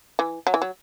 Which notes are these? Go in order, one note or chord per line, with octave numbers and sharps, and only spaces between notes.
E3
F#3
E3
F#3